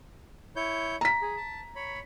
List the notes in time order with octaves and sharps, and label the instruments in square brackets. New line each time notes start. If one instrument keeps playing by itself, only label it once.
[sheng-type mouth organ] E4 C#5 G6
[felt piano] A#5 B6
[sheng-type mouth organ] G#4
A5
C#5 B5